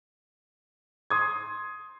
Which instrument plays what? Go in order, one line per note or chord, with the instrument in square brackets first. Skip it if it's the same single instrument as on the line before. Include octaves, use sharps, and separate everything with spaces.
[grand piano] C6 D#6 G#6